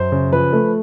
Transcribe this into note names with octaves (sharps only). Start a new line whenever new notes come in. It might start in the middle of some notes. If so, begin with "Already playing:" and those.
Already playing: F#2 C5
C#3
F3 B4
A3